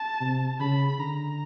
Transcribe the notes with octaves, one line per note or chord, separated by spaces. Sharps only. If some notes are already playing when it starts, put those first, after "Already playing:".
Already playing: A5
C3
C#3 B5
D3 A#5